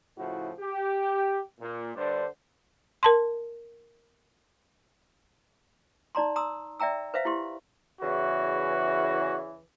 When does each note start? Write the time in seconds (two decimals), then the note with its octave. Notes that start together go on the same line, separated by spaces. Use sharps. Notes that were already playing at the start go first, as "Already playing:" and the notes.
0.18 A2 C#3 F3 E4 F#4
0.59 G4
1.60 A#2
1.95 G2 D3 C5 D5
3.03 A#4 A5 C6
6.15 D#4 D5 A#5 C6
6.36 A#5 C6 D#6 E6
6.80 D5 E5 G5 A#5 E6
7.14 B4 C5 E5 F5
7.25 E4 G4 C6
8.01 E2 C#3 E3 F#4